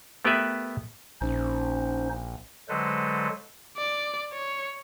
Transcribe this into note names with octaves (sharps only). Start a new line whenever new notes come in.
A3 B3 G4 A#4 B4 E5
A#1 C#4 D#4 C5
D3 F#3 G#3 A4 B4 C5
D5
C#5